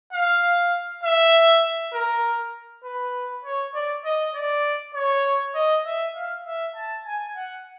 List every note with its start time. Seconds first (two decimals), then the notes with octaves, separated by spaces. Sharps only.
0.13 F5
1.04 E5
1.93 A#4
2.84 B4
3.45 C#5
3.74 D5
4.04 D#5
4.35 D5
4.94 C#5
5.55 D#5
5.86 E5
6.16 F5
6.46 E5
6.76 A5
7.06 G#5
7.36 F#5